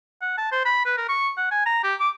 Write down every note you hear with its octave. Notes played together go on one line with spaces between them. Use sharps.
F#5
A5
C5
B5
B4
A#4
C#6
F#5
G#5
A#5
G4
D6